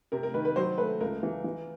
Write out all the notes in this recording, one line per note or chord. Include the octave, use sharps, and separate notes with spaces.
C3 A#4
A#4
D#3 B4
B4
F#3 C5
A3 B4
C#2 A#4
E3
E3